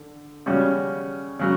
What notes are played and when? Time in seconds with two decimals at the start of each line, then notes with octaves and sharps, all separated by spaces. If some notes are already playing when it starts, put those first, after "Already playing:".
Already playing: D3
0.46 C#3 G3 C#4 F#4
1.39 C#3 F#3